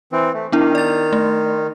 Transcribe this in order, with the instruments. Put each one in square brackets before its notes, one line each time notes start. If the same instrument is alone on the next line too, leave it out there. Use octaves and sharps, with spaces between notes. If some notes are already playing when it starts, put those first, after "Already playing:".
[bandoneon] E3 C4
A3
[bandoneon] D#3 [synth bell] B3 D4 E4
[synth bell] D5 A6
A3